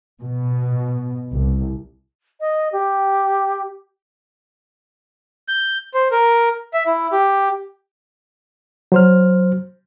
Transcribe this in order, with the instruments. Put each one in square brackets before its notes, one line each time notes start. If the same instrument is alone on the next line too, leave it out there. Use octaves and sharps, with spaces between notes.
[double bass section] B2
C2
[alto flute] D#5
G4
[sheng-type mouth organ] G6
C5
A#4
E5
E4
G4
[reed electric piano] F#3 C5 F6